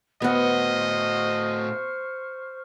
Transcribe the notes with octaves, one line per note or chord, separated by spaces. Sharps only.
A2 B3 F#4 C5 D#5 F#5 C#6 F6